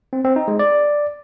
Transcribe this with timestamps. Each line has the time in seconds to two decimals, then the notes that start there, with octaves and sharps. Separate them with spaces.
0.13 C4
0.24 C4
0.36 D#4
0.48 G#3
0.59 D5